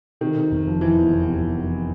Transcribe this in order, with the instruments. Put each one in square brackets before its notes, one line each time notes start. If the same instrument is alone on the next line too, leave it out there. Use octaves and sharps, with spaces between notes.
[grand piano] C3 [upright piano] D#3
[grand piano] C3
F1
F3
[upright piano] E3 [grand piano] F3
[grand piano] E2
E2
C3
E2
F3